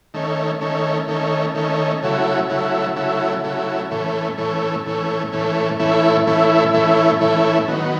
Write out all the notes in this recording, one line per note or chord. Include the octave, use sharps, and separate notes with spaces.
D#3 A3 C#4
D#3 A3 C#4
D#3 A3 C#4
D#3 A3 C#4
C#3 F#3 A3 E4
C#3 F#3 A3 E4
C#3 F#3 A3 E4
C#3 F#3 A3 E4
A2 E3 A3 C#4
A2 E3 A3 C#4
A2 E3 A3 C#4
A2 E3 A3 C#4
A2 E3 A3 C#4 E4
A2 E3 A3 C#4 E4
A2 E3 A3 C#4 E4
A2 E3 A3 C#4 E4
D#3 F#3 B3